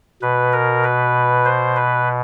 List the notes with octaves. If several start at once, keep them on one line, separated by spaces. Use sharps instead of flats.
B2 B4
A#4
B4
C5
B4